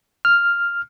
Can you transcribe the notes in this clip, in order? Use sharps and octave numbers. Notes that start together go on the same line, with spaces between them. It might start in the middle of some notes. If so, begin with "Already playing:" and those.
F6